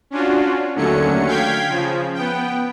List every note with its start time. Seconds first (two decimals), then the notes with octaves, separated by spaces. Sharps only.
0.11 C#4 D4 F4 F#4
0.75 D#2 D3 F#3 A3 C#4 C#7
1.27 F5 G5 G6 G#6 B6
1.69 C#3 F3
2.14 B3 G5